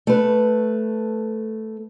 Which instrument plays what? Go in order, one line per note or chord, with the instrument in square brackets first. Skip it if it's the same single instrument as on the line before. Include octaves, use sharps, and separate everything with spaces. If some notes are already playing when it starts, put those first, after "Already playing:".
[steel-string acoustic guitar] A3 B4